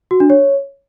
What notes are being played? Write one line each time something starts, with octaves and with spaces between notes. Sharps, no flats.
F#4
D4
C#5